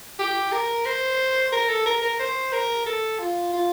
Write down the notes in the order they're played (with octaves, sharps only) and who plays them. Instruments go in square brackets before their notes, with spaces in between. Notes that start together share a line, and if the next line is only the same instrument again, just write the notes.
[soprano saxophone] G4
A#4
C5
A#4
A4
A#4
A#4
C5
A#4
A4
F4
F4